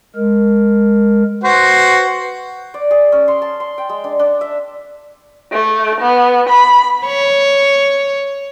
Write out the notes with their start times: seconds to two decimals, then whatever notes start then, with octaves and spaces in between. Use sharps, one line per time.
0.16 G#3 A#4
1.44 F#4 B4 C5
2.74 D5
2.91 G#4
3.12 C#4
3.28 C6
3.42 A5
3.60 C6
3.78 G5
3.89 G#3
4.04 D4
4.19 D4
4.41 E5
5.52 A3
6.01 B3
6.49 B5
7.06 C#5